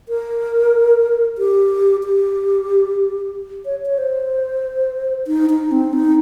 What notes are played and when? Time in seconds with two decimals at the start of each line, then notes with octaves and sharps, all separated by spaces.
0.09 A#4
1.38 G4
2.04 G4
3.66 C#5
3.86 C#5
3.98 C5
5.27 D#4
5.50 D#4
5.72 C4
5.93 D#4